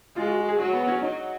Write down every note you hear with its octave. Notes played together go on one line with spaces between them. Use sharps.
G#3 F4
F#4
F#4
G#4
F#3 F#4
B3
C#4
F#3 D#4